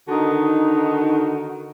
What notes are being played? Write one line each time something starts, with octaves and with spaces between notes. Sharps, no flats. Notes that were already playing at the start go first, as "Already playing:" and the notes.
D3 D#3 D#4 F#4